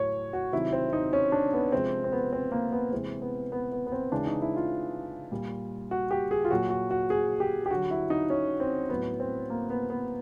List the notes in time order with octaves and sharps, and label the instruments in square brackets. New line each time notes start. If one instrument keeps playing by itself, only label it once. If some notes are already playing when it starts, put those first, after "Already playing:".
Already playing: [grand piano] A2 F#3 C#5
F#4
C3 D#3 F#3 E4
C4
D#4
C#4
D4
B3
C3 F3 G#3 C4
C4
B3
C4
A#3
B3
C3 E3 G#3 C4
B3
B3
B3
B3
C4
C#3 E3 G#3 D4
D#4
E4
F4
A#2 G3
F#4
G4
G#4
F4
A#2 F#3 F#4
F#4
F#4
G#4
G4
G4
D3 F#3 F#4
E4
D#4
C#4
C4
A2 F#3 B3
C4
A#3
B3
B3